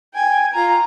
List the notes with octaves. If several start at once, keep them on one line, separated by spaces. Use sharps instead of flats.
G5 G#5
F4 A#5